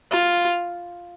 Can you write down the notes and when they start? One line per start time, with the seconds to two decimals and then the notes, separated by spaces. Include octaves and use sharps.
0.12 F4